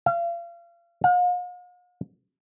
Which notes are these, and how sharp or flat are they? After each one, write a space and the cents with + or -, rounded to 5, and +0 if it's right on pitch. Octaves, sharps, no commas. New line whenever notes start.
F5 -35
F5 +45